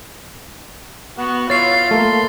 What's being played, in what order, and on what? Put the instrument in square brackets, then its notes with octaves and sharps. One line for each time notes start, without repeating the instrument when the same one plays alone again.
[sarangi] B3 [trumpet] F#4
[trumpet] E4 [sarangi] F4 [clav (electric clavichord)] C#5 [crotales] A6 C7
[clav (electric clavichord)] A3 A#3 [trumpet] C6